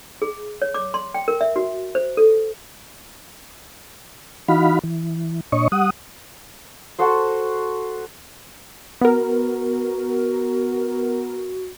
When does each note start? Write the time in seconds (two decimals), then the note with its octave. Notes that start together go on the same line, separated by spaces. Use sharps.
0.22 G#4
0.62 C#5
0.74 D6
0.94 C6
1.14 G5
1.28 A#4
1.41 E5
1.56 F#4
1.95 C5
2.17 A4
4.48 E3 D#4 F#4 F5 B5
4.84 E3
5.52 A#2 D4 C#5 D#5 C#6
5.72 G3 F#5 D#6
6.99 F#4 A4 C5
9.01 B3 F#4 A#4